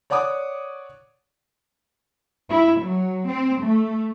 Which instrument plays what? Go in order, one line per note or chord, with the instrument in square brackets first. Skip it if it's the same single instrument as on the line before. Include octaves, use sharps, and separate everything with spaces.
[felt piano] C#5 D5 F#5 D6 D#6
[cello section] E4
F#3
C4
A3